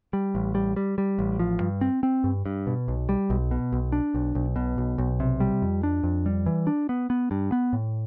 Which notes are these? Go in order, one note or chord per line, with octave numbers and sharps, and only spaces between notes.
G3
A1
G3
G3
G3
A1
F3
G2
C4
C4
G2
G2
B2
B1
G3
B1
B2
B1
D4
B1
B1
B2
B1
B1
C3
G3
F2
D4
F2
G3
E3
D4
B3
B3
G2
B3
A2